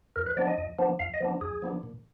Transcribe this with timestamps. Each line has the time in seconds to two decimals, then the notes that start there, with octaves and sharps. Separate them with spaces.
0.16 F2 A#4
0.26 B4
0.37 F3 B3 D4 D5
0.47 D#5
0.58 F2
0.79 F3 B3 D4
0.99 F2 F5
1.14 D#5
1.20 F3 B3 D4
1.41 F2 G#4
1.62 F3 B3 D4
1.83 A#2